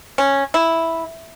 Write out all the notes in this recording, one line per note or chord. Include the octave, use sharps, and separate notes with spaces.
C#4
E4